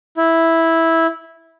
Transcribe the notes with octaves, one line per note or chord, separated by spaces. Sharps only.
E4